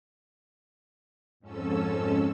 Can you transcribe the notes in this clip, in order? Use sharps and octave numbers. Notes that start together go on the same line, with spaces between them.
F2 G#2 C#4 A4 E6